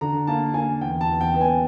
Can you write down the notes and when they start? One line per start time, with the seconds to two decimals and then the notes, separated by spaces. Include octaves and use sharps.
0.01 D3 A#5
0.27 A#3 A5
0.54 A#3 G#5
0.81 E2 G5
1.01 A5
1.07 E2
1.21 G5
1.34 B3
1.41 G#5